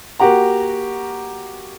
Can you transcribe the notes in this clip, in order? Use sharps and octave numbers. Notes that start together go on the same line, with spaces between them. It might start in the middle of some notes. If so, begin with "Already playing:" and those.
A#3 F#4 G4 F#5 A#5